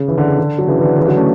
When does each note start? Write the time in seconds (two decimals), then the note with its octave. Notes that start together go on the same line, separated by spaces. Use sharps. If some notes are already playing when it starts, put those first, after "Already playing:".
Already playing: C#3
0.08 E3
0.18 D3
0.27 C#3
0.38 D3
0.58 F#3
0.67 C#3 E3
0.78 E3
0.82 D3
0.97 C#3 E3
1.06 D3 F#3
1.16 A3 C#4